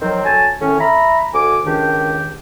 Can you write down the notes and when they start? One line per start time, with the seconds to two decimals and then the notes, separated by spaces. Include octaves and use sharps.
0.01 D#3 F3 F#3 C4
0.24 D2 C#5 G#5 A5
0.59 A2 D#3 C#4
0.80 E5 A#5 B5
1.34 D2 G#5 D6
1.65 C#2 D#3 D4 G4